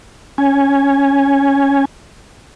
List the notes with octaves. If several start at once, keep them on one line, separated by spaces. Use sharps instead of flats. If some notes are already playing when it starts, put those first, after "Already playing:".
C#4 G#5